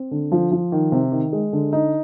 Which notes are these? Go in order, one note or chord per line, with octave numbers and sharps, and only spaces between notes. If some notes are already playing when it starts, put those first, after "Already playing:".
Already playing: C4
D3
F3
F3
D#3
C3
D#3
G#3
D3
D#4